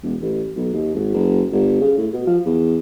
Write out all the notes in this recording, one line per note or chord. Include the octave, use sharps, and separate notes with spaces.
E1
A1
B1
D#2
G#1
F#1
G1
C#3
A2
B2
F3
E2